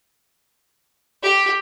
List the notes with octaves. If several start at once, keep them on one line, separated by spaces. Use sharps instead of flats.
G4